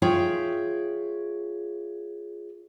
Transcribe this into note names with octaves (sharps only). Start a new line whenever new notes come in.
F4 G#4 C#5 E5 G5